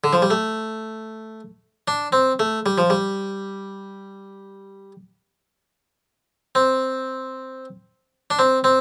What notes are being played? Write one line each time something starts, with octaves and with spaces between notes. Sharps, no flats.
D3
F3
G3
A3
D4
C4
A3
G3
F3
G3
C4
D4
C4
C4